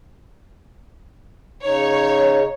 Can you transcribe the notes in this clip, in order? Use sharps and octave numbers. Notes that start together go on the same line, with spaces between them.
C#3 D#4 C#5